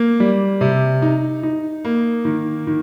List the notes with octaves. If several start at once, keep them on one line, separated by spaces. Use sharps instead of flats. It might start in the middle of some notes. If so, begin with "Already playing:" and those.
Already playing: A#3
G3
C3
D#4
D#4
A#3
D#3
D#3